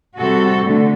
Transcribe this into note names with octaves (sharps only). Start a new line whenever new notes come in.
C3 G3 C4 F#4 A4
D3 A3